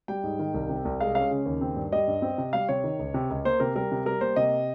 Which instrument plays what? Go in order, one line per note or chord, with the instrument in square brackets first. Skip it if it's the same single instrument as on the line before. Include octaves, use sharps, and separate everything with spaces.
[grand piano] G3 G5
G#2
D#3
C2
C3
C2
G#3 F5
C#4 F5
C#3
D#2
C4
G2
G3 D#5
G2
C4
C3
G3 F5
C3 C#5
D#3
C#2
C3
C#2
A#3 C5
C3 A#4
G3 A#4
C3
G3 A#4
A#3 C5
C3 D#5